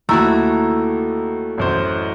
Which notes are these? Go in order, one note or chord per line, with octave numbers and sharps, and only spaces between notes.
D#2 A3 E4 F#4 A#5 E6
A1 F#2 C5